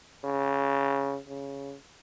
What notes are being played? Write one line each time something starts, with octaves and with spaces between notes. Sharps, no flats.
C#3
C#3